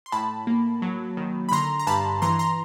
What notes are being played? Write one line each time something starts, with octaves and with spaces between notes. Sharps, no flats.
C6
A2 A5 B5
A#3
F#3
D#3
B5
D3 A#5 C6
A#5
G2 A5 B5
E3 A#5 C6
A#5 C6